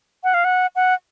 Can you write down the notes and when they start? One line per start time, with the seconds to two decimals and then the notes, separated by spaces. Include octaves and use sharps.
0.24 F#5
0.34 F5
0.45 F#5
0.76 F#5